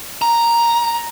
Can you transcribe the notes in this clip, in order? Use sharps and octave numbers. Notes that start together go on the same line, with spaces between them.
A#5